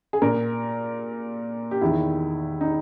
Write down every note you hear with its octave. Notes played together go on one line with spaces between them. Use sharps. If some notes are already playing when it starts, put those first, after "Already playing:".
G#4
A#2 A#4
G4
E2 D#3 E4
D#4